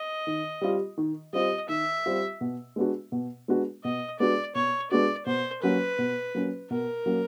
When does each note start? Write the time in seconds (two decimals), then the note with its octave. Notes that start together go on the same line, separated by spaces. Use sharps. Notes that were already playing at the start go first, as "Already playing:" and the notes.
Already playing: D#5
0.27 D#3
0.61 G3 C4 F4
0.97 D#3
1.33 G3 C4 F4 D#5
1.69 D#3 E5
2.06 G3 C4 F4
2.41 B2
2.76 G#3 B3 D4 F#4
3.12 B2
3.48 G#3 B3 D4 F#4
3.84 B2 D#5
4.20 G#3 B3 D4 F#4 D5
4.55 B2 C#5
4.91 G#3 B3 D4 F#4 D5
5.26 B2 C5
5.63 F#3 A#3 C#4 B4
5.98 B2
6.35 F#3 A#3 C#4
6.70 B2 A#4
7.06 F#3 A#3 C#4